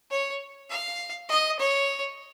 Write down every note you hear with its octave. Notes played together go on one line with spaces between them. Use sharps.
C#5
F5
D#5
C#5